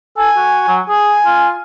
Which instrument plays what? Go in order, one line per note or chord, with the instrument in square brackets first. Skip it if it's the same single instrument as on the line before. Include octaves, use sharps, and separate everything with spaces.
[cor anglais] A4 [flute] G#5
[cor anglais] F#4
F#3
[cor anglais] G#4 [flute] G#5
[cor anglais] F4